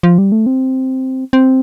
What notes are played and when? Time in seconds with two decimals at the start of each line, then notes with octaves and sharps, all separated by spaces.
0.03 F3
0.18 G3
0.32 A3
0.46 C4
1.33 C4